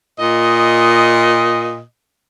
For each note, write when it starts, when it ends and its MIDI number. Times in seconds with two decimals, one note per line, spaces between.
0.19 1.82 46
0.19 1.82 75